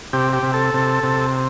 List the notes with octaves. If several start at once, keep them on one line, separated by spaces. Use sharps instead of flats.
C3 G4
G4
C3
A4
C3
C3